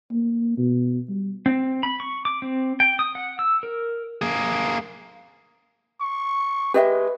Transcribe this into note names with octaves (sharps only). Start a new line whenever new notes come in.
A#3
B2
G3
C4
B5
C#6
D6
C4
G5
D#6
F#5
E6
A#4
A#3 G#4
C#6
G#3 G4 B4 D#5 E5